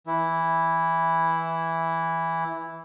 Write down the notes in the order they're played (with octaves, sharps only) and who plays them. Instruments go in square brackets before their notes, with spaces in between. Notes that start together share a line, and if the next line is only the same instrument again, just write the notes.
[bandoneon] E3 E4